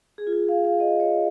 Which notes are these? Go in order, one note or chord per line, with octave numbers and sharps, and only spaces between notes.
G#4
F4
G#4
F5
F5
D#5
C#5